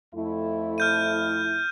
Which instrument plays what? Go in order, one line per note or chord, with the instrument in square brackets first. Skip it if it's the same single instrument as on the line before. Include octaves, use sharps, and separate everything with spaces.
[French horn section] F2 A3 E4
[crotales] F6 G6 D#7